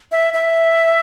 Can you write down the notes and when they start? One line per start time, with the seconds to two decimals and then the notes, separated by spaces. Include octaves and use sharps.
0.12 E5
0.34 E5